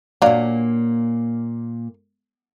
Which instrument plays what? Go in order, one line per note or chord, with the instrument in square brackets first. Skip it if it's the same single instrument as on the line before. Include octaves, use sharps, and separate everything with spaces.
[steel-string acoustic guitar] A#2 A#3 [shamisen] F#3 D4 F5